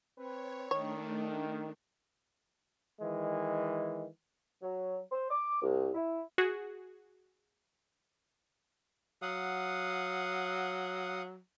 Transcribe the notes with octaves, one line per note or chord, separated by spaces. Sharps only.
C4 B4 C#5
D#3 A3 D4 C#5
D#3 E3 G#3
F#3
C5
D6
C2
E4
F#4 G#4
F#3 F5 F#5 D#6